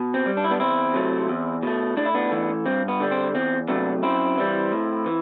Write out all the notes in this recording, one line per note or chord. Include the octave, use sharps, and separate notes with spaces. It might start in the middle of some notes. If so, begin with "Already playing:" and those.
Already playing: B2
C4
G3
D4
E4
B3 D4
E2 C4 E4
C3 F#3 A3
E2
B2 A3
A2 D4
E4
B3 D4
E3 A3
G2 C4
B3
D3 G3
C4
E2 C4
C3 F#3 A3 B3 D4
F#2 C4 E4
E3 G3
A2
E3